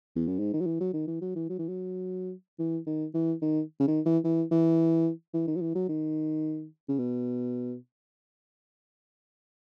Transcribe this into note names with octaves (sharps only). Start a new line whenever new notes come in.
E2
F#2
G#2
D#3
F#3
E3
F#3
D#3
E3
F#3
E3
F#3
E3
F#3
E3
D#3
E3
D#3
C#3
D#3
E3
E3
E3
E3
D#3
F#3
E3
F#3
D#3
C#3
B2